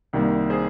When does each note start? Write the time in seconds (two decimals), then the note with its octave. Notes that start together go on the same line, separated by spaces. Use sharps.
0.13 C2 C3 D#3 G3 A#3
0.50 G#4 C5